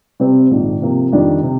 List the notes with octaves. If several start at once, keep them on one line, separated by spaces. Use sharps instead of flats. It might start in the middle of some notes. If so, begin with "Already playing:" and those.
C3 G3 C4
A#1 G#2 D#3
C3 F3 A#3
F2 D#3 G3 D4
C3